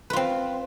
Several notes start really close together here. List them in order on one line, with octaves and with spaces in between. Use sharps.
B4 F4 C4